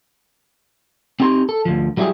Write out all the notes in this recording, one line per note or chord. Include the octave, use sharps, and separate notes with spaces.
C4 D#4 G4 B5 C6
A4
D2 F3
F#3 G3 E4 F4 G4 G#4